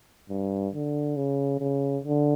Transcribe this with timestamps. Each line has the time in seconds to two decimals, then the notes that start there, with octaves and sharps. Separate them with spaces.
0.29 G2
0.73 D3
1.16 C#3
1.59 C#3
2.04 D3